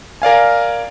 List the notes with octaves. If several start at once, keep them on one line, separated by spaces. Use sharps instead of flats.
A#4 D5 F5 G#5